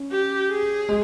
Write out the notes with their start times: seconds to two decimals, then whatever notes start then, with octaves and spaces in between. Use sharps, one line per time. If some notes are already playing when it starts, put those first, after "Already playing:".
Already playing: C#4
0.12 G4
0.51 G#4
0.89 G#3